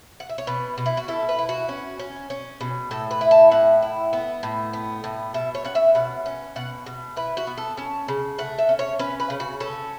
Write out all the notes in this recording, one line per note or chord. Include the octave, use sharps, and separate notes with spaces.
F#5
E5
C#5
B2 B4
B2
E4
F#4
E4 A4
B4
E4
F#4
C#4
C#4
C#4
B2
A2 A4
B4
E4
A5
A2 F#5
E4
B3
A2
B3
A2
B2 E5
C#5
C#4 F#5
E5
B2 F#5
C#4
B2 F#5
B2
E4 B4
F#4
B3
A4
C#4 A5
C#3
A3 F#5
E5
C#4
C#5
C#4 B4
B4
C#3
F#4
C#4 A4